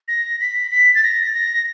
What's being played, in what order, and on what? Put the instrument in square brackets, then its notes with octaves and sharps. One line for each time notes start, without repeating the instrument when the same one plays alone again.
[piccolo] A#6
B6
B6
A6
A#6
A#6